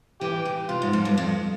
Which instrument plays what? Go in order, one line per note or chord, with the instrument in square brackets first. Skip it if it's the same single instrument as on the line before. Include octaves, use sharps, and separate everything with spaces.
[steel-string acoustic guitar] E3 [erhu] G4
[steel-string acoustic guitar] C#3
[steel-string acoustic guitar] C3 [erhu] F4
[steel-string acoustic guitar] G#2
F2
G2
F2